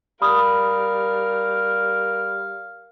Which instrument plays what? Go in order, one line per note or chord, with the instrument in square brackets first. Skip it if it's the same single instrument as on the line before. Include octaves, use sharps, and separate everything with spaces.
[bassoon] G3 [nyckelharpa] A#4 [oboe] F5 [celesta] B5 D#6